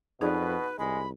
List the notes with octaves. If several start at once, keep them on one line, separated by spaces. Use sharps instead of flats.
F2 B2 D#4 G#4 B4 D5
C2 G#3 B5